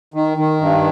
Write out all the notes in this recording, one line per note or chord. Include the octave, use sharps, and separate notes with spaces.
D#3
D#3
G2